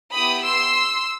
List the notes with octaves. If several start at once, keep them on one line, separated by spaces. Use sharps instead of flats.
B3 E4 G4 B5 D#6
C6 E6